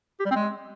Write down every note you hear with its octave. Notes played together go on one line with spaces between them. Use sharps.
G4
G3
C4
G#3